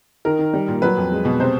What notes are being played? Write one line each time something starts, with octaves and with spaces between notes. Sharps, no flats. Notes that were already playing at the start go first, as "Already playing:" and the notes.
D#3 A#4
D#3
G3
A#2
F#3 B4
F2
G#3
B2
C3 C5